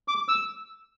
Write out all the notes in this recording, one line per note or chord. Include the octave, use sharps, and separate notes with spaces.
D6
E6